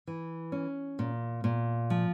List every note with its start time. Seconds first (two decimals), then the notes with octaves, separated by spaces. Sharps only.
0.07 E3
0.52 C#4
0.99 A#2
1.44 A#2
1.90 F3